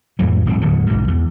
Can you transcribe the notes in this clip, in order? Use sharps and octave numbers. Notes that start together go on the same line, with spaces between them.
F2 A2 E3 F#3
D#1 G#2 F#3 C4
D1 E2 D3 F#3
B1 G#2 B2
E2